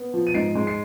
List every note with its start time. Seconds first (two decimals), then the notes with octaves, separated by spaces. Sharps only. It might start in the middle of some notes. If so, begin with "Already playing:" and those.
Already playing: B3
0.14 F3
0.27 D#7
0.34 G#2 C7 D7
0.55 G#3
0.67 C7